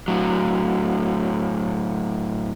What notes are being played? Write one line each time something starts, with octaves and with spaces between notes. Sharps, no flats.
A2 F#3